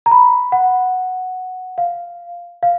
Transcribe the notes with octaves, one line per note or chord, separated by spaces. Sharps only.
A#5
B5
F#5
F5
F5